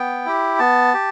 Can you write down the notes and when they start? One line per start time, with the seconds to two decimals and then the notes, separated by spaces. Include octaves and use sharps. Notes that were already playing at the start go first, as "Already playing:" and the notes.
Already playing: B3 G5
0.26 E4 G4
0.59 B3 A5
0.94 G4